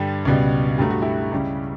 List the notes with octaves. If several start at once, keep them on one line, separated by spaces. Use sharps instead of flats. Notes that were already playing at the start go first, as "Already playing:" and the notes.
Already playing: G2 D3 G3
C#2 B2 G3
G2 F#3 A3 G4
F#4
E4 G4
C#2 C#3 G3